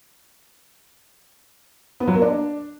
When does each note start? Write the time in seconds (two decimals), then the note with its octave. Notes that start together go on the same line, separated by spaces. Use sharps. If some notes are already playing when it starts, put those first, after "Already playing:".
2.00 B3
2.07 F#3
2.15 A#3
2.22 D4